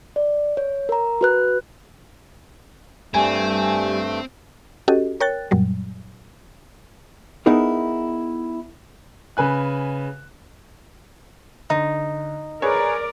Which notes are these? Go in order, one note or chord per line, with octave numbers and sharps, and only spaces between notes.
D5
C#5
A#4 A#5
F#4 B4 F#6
G2 G3 A3 C4 G#5
C#4 F#4 G4 A4 D#5
A#4 C#5 G5 F#6 A6
F#2 A#2 F#3 G3
B3 D#4 E4 G#4 A#4
C#3 B4 G#5 F#6
D3 D#4
G#4 A#4 B4 C#5 D5